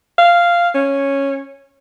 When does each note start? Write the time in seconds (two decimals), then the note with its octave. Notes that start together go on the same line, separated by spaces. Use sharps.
0.18 F5
0.75 C#4